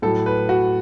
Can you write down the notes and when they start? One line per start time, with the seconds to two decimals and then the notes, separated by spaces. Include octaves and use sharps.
0.02 A2 F#3 A4
0.26 B4
0.49 F#4